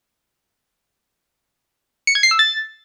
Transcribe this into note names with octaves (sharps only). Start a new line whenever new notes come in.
C#7
G#6
C7
E6
A6